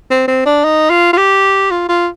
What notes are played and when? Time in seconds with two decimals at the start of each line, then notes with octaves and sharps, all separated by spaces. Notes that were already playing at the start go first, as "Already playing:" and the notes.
0.11 C4
0.28 C4
0.46 D4
0.64 D#4
0.90 F4
1.13 F4
1.17 G4
1.71 F4
1.89 F4